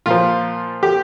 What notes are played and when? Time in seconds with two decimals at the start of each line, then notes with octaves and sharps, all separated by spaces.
0.06 A#2 F3 F4
0.83 G4